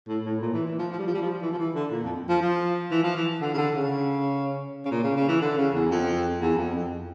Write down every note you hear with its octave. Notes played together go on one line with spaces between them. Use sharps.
A2
A2
A#2
E3
E3
F3
F3
G3
F3
G3
F3
E3
F3
E3
D3
A#2
F2
F3
F3
E3
F3
E3
D3
C#3
D3
C#3
C#3
A#2
C#3
C#3
E3
D3
C#3
E2
F2
E2
F2
F2